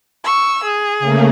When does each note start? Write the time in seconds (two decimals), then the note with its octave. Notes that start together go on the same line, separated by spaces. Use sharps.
0.24 C#6 E6
0.63 G#4
1.00 C#3 A3 A#3